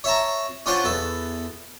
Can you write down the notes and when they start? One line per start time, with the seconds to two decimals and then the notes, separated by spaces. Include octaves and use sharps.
0.04 C#5 E5 A5 A#5
0.66 C#4 D4 F4 C5 F#5
0.84 E2 A4